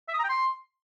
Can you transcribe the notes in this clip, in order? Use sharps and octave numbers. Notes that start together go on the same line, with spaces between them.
E5
D#6
A#5
G5
C6